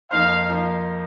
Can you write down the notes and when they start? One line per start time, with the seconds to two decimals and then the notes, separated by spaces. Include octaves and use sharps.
0.11 F2 F3 A#3 D#4 C5 F5
0.49 F3 A#3 D#4 C5